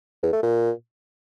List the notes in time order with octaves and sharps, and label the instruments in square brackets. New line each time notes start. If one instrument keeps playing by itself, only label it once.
[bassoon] E2
A3
A#2